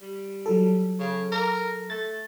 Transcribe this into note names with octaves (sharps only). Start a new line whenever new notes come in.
G3
F#3 A4
C#3
A#4
A3 A6